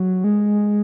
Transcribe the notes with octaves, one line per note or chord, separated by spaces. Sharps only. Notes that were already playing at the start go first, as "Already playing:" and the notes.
Already playing: F#3
G#3